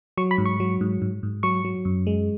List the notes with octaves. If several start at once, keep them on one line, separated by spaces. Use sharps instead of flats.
F#3 C#6
B5
G#2
C#6
F#3
G#2
G#2
G#2
F#3 C#6
F#3
F#2
G#3